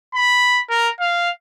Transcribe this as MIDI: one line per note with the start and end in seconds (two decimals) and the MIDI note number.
0.14 0.61 83
0.70 0.88 70
1.00 1.29 77